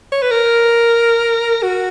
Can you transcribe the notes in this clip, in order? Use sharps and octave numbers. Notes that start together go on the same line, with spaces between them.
C#5
B4
A#4
F#4